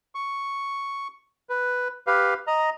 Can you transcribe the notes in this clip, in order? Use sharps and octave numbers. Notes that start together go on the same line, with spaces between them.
C#6
B4
G4 B4 F5
D#5 A#5